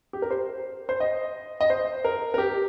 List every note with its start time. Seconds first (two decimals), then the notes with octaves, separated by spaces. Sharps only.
0.13 G4
0.22 A#4
0.31 C5
0.89 C5
1.00 D#5
1.61 D#5
1.70 C5
2.05 A#4
2.34 A#4
2.38 G4